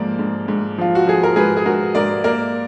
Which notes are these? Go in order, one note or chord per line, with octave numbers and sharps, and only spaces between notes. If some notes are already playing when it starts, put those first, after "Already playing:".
Already playing: G#2 F3 A#3 A#4 D5
G#2
G#2
F3 F4
F#4
F3 G#4
A#4
G#2 G#4 B4
G#4
G#2 F#4 A#4
G#2 A#4 D5
A#3 A#4 D5